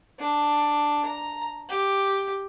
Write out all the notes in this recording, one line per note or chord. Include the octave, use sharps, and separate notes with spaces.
D4
A#5
G4